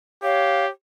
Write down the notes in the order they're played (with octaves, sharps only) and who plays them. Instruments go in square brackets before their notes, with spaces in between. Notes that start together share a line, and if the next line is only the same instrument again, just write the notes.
[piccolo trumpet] G4 [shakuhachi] C#5 [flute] F5